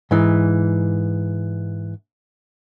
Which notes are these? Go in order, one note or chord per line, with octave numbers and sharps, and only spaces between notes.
G#2 E3